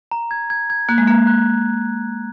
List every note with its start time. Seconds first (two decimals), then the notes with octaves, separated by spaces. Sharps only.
0.11 A#5
0.31 G#6
0.50 G#6
0.70 G#6
0.89 A#3 F#6
0.98 G#3
1.08 A#3 A#5
1.27 F#6